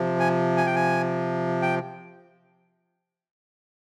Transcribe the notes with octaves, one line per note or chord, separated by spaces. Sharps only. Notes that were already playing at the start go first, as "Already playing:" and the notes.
Already playing: C3 F3
G#5
G#5
G5
G#5
G5